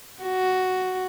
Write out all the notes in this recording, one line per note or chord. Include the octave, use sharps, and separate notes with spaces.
F#4